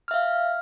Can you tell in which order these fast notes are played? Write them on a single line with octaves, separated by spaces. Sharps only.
F6 E5 F5